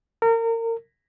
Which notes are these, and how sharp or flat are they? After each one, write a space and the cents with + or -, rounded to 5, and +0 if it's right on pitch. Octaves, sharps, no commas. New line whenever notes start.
A#4 -30